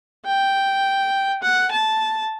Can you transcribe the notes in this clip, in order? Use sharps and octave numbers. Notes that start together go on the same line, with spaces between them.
G5
F#5
A5